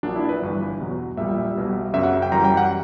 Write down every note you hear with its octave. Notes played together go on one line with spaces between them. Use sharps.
A#1 A#2 F#3 D4
E4
B4
G1 G2 E3
E2 B2 F#3
A#1 A#2 G3 E5
B1 B2 G3
F#2 C#3 F#3 E5
F#5
G5
F#2 E3 G3 A#5
G5
F#5